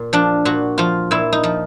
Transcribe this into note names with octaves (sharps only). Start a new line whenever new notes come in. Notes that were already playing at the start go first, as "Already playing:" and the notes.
Already playing: A#2
F3 D4
A#2 F#4
F3 F4
A#2 E4
D#4
F3